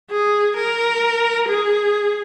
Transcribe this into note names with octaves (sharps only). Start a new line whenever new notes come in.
G#4
A#4
G#4